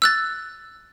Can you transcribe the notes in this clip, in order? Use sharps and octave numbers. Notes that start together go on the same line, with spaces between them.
E6 F#6 A6